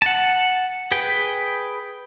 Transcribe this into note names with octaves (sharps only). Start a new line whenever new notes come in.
F#5 A5
G#4 B4 G5